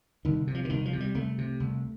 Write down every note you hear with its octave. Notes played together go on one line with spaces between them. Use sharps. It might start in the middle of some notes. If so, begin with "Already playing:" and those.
C2 D#3
C3
F3
D3
C2 D#3
F3
C3
G3
C2 A3
C3
C2